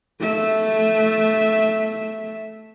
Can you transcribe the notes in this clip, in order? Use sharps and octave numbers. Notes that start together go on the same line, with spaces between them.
A3 E5